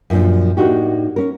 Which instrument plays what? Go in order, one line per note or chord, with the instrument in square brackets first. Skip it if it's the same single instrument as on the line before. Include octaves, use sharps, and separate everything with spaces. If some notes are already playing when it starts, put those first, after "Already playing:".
[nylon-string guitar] F#2 A#2 F3 D4
A2 A#3 D4 D#4 F#4 G4
C#4 A#4